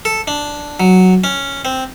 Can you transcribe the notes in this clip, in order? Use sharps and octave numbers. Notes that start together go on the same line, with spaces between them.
A4
D4
F#3
C#4
C4